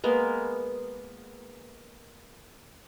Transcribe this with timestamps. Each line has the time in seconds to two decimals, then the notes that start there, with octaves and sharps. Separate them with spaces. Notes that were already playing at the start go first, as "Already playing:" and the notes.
0.04 G#3 A#3 B3